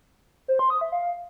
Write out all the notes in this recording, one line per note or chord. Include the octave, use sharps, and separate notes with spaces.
C5
C6
D#6
E5
F5